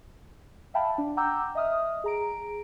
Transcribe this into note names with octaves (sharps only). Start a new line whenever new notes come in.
E5 F5 G5 A5 B5
D4
F#5 G5 A#5 D6 E6 G6
D#5 E5 D#6 F6
G#4 A#5 D7